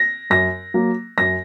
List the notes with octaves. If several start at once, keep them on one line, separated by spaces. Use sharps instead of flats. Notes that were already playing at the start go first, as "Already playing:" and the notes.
Already playing: A#6
F#2 A#6
F#3 A#3
F#2 A#6